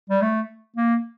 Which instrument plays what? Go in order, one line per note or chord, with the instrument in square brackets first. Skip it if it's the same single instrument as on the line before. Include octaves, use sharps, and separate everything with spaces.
[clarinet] G3
A3
A#3